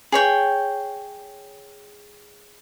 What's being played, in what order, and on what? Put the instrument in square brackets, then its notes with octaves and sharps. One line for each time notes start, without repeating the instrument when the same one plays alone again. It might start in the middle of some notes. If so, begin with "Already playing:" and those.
[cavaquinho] G#4 C#5 G5